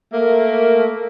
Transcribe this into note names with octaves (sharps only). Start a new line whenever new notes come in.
A3 A#3 A#4 E5